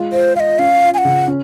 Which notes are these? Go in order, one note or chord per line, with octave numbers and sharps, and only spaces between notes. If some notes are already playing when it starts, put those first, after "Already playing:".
Already playing: G#3 F4
F4 C5
F4 D#5 F5
C#4 F5
F4
G#5
F#5
C#3
C#4